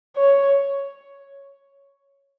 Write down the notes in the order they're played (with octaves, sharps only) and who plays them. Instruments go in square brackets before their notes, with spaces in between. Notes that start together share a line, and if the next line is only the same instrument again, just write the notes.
[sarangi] C#5